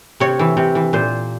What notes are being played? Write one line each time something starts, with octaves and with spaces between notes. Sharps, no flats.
C3 C#5
E3
C3
E3
A#2 C5